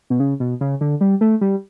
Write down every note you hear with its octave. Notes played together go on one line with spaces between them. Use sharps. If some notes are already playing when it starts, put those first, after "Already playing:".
B2
C#3
B2
C#3
D3
G3
A3
G3